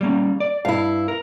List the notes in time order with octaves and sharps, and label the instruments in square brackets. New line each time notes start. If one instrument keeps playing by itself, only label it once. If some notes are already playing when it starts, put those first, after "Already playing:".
[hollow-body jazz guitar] G3 A#3 C#4
D5
[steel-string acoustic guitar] G2 E4 [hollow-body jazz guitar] F5
[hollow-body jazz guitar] A#4